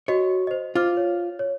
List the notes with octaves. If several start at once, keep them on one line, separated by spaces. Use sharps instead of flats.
F#4 C#5 D#5
C5 D#5
F4 C5 D6 F6
C#5
C#5